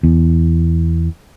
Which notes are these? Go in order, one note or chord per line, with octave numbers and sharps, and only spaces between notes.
E2